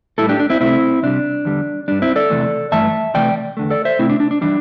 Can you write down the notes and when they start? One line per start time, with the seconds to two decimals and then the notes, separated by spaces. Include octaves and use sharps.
0.18 A2 G3 E4 A4
0.29 D4 G4
0.40 D4
0.50 C4 E4
0.61 C3 A3 C4 E4
1.03 C3 G3 D4
1.45 E2 D3 G3
1.88 G2 G3 D4
2.02 C4 E4
2.16 A4 D5
2.30 E2 C3 E3 A3
2.72 G2 E3 A3 E5 A5
3.14 C3 E3 A3 D5 G5
3.57 E2 D3 A3
3.70 A4 D5
3.85 C5 E5
3.99 C3 A3 C4 E4
4.10 D4
4.20 D4
4.31 D4
4.41 E3 G3 D4